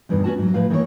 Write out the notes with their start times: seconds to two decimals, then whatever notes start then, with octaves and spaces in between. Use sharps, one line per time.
0.09 E2 G2 B2 D#3
0.24 B3 C#4 F#4 F#5 A5
0.38 G#2 F#3
0.54 A2 F3 B4 F5
0.70 D#3 E3 A#3 A#4 C#5